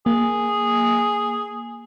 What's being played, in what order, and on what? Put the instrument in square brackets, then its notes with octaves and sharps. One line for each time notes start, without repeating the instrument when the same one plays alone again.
[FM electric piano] A#3 [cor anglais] G#4